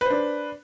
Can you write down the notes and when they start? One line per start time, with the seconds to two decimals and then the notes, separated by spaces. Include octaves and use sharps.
0.01 B4
0.06 C5
0.10 D4